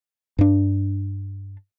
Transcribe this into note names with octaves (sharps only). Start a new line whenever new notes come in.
G2 D4